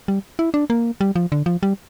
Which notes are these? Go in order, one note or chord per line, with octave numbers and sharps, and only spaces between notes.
G3
E4
D4
A#3
G3
F3
D3
F3
G3